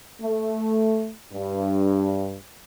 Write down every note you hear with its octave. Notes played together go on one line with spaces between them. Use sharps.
A3
G2